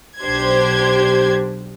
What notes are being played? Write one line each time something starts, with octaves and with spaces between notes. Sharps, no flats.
B1 D4 G4 C5 G#6